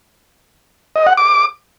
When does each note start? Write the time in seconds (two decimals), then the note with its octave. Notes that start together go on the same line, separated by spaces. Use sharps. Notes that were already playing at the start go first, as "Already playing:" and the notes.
0.96 D#5
1.07 F#5
1.17 D6